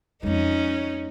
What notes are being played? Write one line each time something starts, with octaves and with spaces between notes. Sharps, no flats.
F2 G#3 C#4 D#4